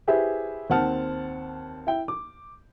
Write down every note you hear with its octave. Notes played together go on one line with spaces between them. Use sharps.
E4 G4 G#4 B4 C5 E5
D#2 C4 F#5 A5 F6
E4 G5
D6